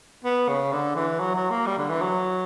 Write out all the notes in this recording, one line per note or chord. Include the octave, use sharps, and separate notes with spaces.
B3
C#3
D3
E3
F#3
F#3
A#3
G3
D3
E3
F#3